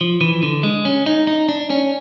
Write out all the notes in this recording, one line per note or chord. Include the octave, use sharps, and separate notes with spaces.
F3
E3
D3
G#3
C#4
D#4
D#4
D4
C#4